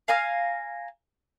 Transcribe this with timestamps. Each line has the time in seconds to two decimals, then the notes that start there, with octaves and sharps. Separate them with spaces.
0.08 F5 G#5 A#5 F6